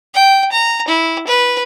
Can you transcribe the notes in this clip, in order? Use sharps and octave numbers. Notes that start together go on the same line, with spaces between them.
G5
A#5
E4
B4